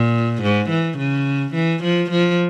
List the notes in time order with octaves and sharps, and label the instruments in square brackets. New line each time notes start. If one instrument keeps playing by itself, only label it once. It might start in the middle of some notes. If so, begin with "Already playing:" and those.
Already playing: [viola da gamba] A#2
G#2
E3
C#3
E3
F3
F3